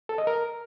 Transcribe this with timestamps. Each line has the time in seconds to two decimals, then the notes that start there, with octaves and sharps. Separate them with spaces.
0.09 A4
0.18 D#5
0.27 A#4